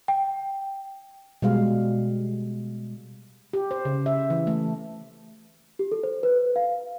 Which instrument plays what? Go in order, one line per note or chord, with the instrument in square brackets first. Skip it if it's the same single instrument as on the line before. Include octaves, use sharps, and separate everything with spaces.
[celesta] G5
[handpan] B2 G3 G#3 F5
G4
C5
C#3
E5
E3
A3
[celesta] G4
A4
C5
B4
F5